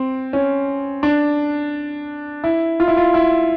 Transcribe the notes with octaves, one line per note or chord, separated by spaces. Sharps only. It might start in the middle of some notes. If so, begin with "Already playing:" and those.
Already playing: C4
C#4
D4
E4
F4
E4
F4
E4